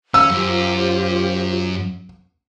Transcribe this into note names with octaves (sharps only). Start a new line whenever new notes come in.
C#4 E6
F#2 F4 G4 C5